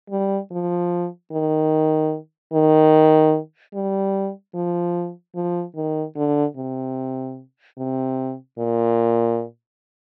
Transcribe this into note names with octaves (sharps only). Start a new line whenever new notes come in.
G3
F3
D#3
D#3
G3
F3
F3
D#3
D3
C3
C3
A#2